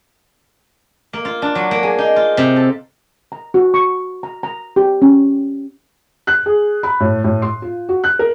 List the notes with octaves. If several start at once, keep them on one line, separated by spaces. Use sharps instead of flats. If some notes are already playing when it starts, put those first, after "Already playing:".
A#3
F4
D4
F#3
A#3
G#4
D#4
F4
C3
A4
A#5
F#4
C#6
A#5
A#5
G4
C#4
F#6
G#4
B5
A2
A2
C6
F4
F#4
F#6
A#4